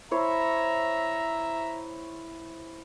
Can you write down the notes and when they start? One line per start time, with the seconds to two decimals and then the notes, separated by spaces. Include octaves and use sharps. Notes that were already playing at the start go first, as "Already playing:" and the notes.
0.11 E4 C5 C#5 E5 A#5